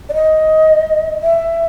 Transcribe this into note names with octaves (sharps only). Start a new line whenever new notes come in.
D5
D#5
E5